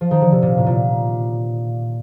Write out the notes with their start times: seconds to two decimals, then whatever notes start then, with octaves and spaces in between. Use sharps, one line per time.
0.01 F3
0.11 D#3
0.21 D3
0.31 C3
0.42 A#2
0.57 A2
0.66 A#2